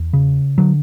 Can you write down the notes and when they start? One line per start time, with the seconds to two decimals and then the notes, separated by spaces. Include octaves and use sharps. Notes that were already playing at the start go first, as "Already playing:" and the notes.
Already playing: E2
0.13 C#3
0.58 D3 F#3